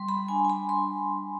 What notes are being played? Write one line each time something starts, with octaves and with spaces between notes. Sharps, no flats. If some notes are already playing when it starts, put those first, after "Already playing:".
Already playing: G3 C6
B5
D4 G#5
G#5
B5
G3 C6
D4